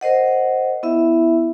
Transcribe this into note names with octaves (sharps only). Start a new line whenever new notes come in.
A#4 C5 D#5 F#5
B3 E4 E5